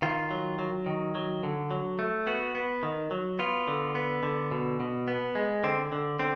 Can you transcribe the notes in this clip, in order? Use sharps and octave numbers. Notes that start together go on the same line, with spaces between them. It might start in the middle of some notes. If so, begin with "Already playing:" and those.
D#3 F4
F#3
F#3
D#3
F#3
D3
F#3
A3
B3 F#4
B3
D#3
F#3
B3 F4
D3
B3
D3
B2
B2
B3
G#3
D3 C4
D3
D3 C4